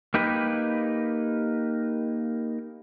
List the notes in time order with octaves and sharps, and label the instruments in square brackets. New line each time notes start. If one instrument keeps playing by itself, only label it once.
[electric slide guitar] A#3 D#4 G4 B4